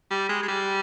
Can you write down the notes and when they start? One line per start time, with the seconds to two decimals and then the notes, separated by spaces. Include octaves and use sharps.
0.11 G3
0.29 G#3
0.43 G#3
0.48 G3